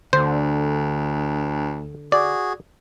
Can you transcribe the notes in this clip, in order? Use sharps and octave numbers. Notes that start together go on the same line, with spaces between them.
D2 D3 C5
F#4 G#4 D5